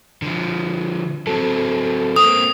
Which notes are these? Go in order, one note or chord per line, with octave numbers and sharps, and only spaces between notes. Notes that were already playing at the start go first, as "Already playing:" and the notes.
D3 F3
F#3 C4 A4
A#3 C4 D#6